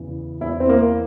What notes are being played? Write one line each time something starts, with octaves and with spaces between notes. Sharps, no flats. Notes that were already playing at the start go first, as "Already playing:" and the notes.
Already playing: E2 C#3 E3
E2 E3 E4
C4
A#3